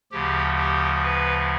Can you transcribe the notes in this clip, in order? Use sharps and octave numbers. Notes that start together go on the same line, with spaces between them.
D2 C#3 F3 G4
G4
B4